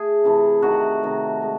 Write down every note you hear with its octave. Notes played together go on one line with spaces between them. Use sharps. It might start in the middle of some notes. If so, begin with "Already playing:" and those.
Already playing: A3 G#4
C3 E3 A3
C3 D#3 A3 F#4
C3 D#3 A3
G#3